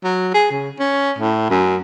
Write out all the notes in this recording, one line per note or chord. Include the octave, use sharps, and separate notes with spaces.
F#3
G#4
C#3
C#4
A2
F#2